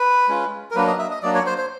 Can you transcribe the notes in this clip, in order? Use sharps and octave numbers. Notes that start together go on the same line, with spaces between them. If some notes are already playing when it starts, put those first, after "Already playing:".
Already playing: B4
G#3 C#4 F4
A#4
F#3 A#3 D4 B4
D#5
E5
D#5
F#3 A#3 D4 D5
C#5
C5
C5